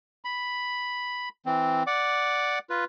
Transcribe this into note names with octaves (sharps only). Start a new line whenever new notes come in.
B5
E3 C4
D5 F#5 D6
F4 B4